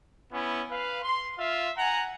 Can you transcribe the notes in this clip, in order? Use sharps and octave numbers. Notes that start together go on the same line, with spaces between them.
B3 C#4 E4
B4 F5
C6
F4 E5 F5
F#5 G#5 A#5